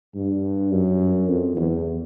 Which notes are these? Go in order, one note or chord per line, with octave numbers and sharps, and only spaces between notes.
G2
F#2
F2
E2